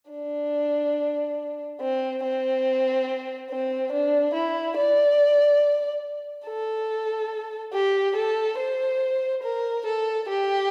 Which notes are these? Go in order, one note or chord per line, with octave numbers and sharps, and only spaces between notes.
D4
C4
C4
C4
D4
E4
D5
A4
G4
A4
C5
A#4
A4
G4